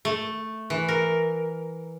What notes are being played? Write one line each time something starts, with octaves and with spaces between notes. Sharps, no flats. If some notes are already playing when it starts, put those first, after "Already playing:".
A3
E3
A#4